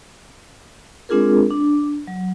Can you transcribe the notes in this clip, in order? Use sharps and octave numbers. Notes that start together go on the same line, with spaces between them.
G#3 C4 D4 F4 G#4 A#4
D4
F#3